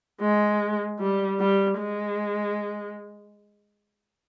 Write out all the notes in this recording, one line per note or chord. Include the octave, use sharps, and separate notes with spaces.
G#3
G3
G3
G#3